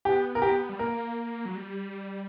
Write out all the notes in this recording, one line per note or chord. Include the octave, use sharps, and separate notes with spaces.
B3 G4
A#4
G4
G3
A#3 A#4
F#3
G3